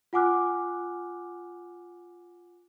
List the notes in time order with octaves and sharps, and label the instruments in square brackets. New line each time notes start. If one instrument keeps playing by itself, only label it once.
[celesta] F4 F#5 G#5 D6 F6 F#6